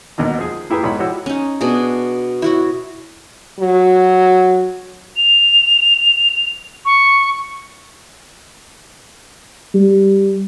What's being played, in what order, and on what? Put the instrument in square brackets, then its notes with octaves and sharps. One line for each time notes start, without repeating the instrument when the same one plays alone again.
[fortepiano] D#2 B2 D3 D#3
F3 G#4
A#3 E4 G4 G#4 B4
B1 G#2 C#5 B5
F3 E4 F#4 G4 C#5 E6
[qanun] C#4 D#4
B2 D4 G#4
E4 F#4 C#5
[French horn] F#3
[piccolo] F7
C#6
[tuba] G3